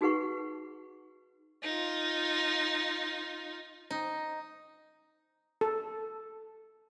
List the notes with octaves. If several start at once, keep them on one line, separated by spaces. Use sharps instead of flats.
D#4 F#4 G#4 B4 F#5 C#6
D#4 F4
D#4
A4